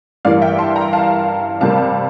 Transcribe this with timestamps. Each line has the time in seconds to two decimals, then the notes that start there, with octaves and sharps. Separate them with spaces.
0.25 G2 E3 A#3 D5 F5
0.42 E5 G5
0.59 A5 C6
0.76 G5 A#5
0.93 F5 A5
1.61 C3 G3 A#3 F5 A5